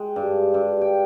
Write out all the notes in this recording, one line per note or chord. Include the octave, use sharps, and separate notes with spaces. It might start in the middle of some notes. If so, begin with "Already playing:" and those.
Already playing: G#3 G5
G2
G2
G5